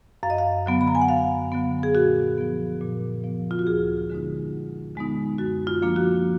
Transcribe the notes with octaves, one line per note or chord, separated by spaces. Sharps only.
F#2 F5
D#5
F5
D3 F#3 B3
B5
A#5
G#5
F#5
F#2 F5
D3 F#3 B3
G#4
A#2 F#4
F3 B3
A#2
F3 B3
F4
F#4
D2 G#4
D3 G#3 B3 D#4
D2
D3 G#3 B3 D#4
F#2 F#4
F4
F3 A#3 D4
F#4